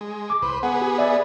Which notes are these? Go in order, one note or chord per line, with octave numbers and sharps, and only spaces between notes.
G#3
D6
C2 B4 C5
B3 G#4 F#5
G4
D5 E5